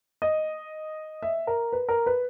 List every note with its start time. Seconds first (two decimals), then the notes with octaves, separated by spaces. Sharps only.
0.22 D#5
1.23 E5
1.47 A#4
1.72 B4
1.89 A#4
2.06 B4